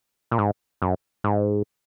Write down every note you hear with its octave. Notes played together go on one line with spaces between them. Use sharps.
A#2
G#2
F#2
G#2